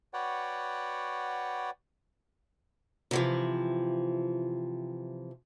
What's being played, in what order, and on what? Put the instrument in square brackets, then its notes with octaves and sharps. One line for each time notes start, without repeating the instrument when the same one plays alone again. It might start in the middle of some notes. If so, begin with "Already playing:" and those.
[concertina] F#4 B4 C#5 D5 F#5 G5
[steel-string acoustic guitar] C3 E3 F3